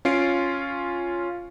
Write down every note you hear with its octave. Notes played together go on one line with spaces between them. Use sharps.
C#4 F4 C7 D7